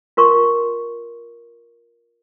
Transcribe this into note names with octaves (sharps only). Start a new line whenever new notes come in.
F4 A#4 C6 C#6